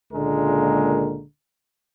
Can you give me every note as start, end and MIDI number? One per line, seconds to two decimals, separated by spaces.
0.13 1.22 37
0.13 1.22 46
0.13 1.22 50
0.13 1.22 56
0.13 1.22 58
0.13 1.22 70